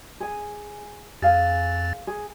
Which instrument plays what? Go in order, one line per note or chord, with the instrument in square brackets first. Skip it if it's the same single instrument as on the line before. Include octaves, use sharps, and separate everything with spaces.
[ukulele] G#4 G#5
[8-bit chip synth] F2 A6 [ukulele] G#4 F5 G#5
[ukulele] G#4